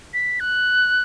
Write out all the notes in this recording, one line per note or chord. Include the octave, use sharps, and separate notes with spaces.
B6
F#6